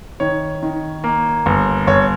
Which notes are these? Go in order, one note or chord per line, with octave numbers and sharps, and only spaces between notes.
D#3 C#5
D#3
A#3
G1
G1 C#5